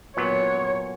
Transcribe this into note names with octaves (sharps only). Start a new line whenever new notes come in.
A#2 F#3 B3 C#5